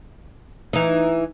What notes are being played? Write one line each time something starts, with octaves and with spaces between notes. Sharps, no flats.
E3 D#4